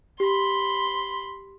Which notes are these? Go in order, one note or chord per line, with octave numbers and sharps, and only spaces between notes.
G4 B5 C6